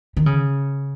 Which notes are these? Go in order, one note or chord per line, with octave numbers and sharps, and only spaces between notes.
D#3
C#3